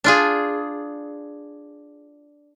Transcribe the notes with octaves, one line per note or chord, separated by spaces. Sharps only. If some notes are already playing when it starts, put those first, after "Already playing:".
D4 F4 G#4